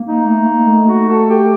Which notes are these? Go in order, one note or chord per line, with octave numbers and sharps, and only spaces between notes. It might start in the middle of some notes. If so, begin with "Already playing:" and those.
Already playing: A#3
D#4
A3
A#3
A3
F#4
A4
G4